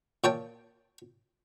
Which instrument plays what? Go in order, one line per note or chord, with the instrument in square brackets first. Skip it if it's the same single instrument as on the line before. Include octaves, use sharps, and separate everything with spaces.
[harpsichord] A#2 C#5 G5 A5